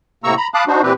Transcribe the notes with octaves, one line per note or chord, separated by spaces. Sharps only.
A2 C3 A#3 A#5 C#6 E6
A#5 B5
F5 A5 B5 D6 D#6 F#6
D4 D#4 F#4 C5
A#2 E3 C4 G4 B4